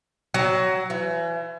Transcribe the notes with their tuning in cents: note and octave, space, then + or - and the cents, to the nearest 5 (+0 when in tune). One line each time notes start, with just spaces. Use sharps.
F#3 +15
E3 +40